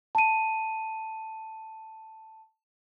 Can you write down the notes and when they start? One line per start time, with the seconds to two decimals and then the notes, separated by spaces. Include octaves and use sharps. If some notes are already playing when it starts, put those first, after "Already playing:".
0.15 A5 D#7